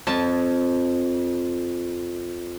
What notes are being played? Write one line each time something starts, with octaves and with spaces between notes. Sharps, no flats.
F2 A5